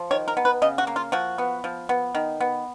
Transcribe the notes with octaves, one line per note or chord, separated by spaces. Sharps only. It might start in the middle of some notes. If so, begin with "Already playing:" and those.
Already playing: F3
D#3 C#5
A#4
B3
B4
C#3 D#5
F#4
A#3
F4
F3 F#4
B3
F3
B3
D#3
B3